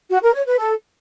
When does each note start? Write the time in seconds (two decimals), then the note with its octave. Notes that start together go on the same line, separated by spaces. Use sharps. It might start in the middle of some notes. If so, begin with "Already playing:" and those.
0.11 F#4
0.23 A#4
0.35 C#5
0.46 B4
0.58 A4